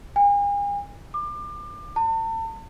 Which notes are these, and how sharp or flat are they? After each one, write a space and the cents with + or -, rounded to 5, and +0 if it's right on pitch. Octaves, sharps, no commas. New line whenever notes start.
G#5 -40
D6 +30
A5 +40